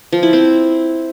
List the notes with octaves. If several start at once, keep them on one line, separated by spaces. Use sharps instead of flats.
F3
E4
C4